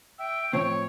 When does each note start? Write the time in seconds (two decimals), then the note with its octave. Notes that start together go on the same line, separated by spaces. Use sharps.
0.19 E5 G5
0.53 A2 F3 C4 C#5